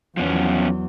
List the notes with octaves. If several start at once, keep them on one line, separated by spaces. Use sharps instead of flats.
E2 F3 F#3 B3 C#4